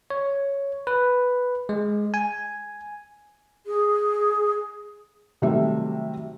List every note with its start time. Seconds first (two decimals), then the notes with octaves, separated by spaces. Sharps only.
0.10 C#5
0.87 B4
1.69 G#3
2.14 G#5
3.66 G#4
5.42 C3 D#3 F#3 G3 A3 E5